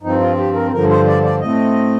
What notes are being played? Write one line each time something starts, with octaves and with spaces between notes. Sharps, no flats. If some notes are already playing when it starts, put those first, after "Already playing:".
G2 F3 C4 D#4
F4
G4
A#4
G2 D3 F3 A#4
C5
D5
D5
A2 A3 C4 D#5